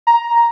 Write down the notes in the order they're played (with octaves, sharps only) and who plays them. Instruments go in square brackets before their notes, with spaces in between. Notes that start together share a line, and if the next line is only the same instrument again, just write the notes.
[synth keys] A#5